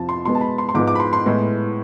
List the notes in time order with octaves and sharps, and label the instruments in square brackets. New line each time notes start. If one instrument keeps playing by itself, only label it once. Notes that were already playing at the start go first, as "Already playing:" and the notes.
Already playing: [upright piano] F2 C3 F3 A5
C6
B2 G#3 B3 C6
A5
B5
C6
C6
G#2 F3 G#3 B3 D6
D6
B5
C6
C6
A2 G#3 B3